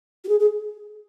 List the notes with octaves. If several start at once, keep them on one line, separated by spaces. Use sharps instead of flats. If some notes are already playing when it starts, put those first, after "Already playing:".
F#4
G#4
G#4